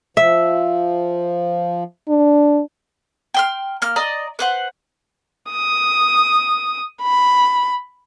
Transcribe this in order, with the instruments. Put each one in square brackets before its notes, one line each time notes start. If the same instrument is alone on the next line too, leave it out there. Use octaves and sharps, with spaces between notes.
[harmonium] F3 [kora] E5
[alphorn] D4
[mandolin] G5 C6 F6
A#3 F6
D5 D#5 A#5
B4 C5 F#5
[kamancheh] D#6
B5